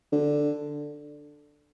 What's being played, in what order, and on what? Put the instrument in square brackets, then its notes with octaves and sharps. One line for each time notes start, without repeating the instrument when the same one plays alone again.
[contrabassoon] D3